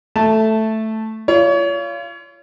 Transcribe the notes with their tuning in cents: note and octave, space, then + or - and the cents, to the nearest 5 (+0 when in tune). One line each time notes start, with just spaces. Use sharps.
A3 +0 A5 +0
F4 -30 C#5 +35